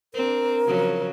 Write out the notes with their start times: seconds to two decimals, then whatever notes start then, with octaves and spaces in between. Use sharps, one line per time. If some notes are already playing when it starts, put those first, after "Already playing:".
0.14 C4 D4 A#4
0.66 C#3 F3 F#3